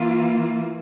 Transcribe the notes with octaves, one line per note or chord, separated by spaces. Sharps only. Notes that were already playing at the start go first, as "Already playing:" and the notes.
Already playing: E3 A#3 F4